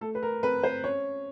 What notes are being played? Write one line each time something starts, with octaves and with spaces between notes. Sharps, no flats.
A3 A4
B4
A#4
C4 B4
C5
C#4 C#5